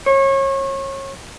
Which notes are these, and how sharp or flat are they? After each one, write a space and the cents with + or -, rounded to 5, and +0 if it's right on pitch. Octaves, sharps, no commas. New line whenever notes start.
C#5 -30